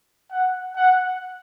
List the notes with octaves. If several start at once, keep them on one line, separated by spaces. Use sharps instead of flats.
F#5
F#5